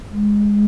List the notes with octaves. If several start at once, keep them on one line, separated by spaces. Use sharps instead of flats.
G#3